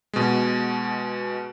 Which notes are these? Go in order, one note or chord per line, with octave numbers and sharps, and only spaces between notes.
B2 G#3